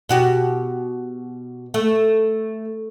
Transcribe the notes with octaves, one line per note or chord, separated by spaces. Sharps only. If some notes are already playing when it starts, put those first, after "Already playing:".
B2 F#4 G4
A3